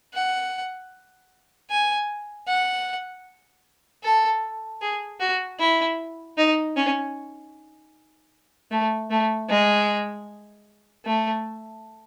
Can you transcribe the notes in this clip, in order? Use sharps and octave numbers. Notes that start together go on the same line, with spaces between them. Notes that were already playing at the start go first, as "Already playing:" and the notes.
F#5
G#5
F#5
A4
G#4
F#4
E4
D#4
C#4
A3
A3
G#3
A3